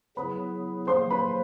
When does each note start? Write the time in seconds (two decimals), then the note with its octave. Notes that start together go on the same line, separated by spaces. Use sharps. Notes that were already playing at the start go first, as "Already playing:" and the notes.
0.17 C#3 F#3 B3 E4 G#4 B4 B5
0.87 C#3 F#3 A#3 C5 C6
1.11 B4 B5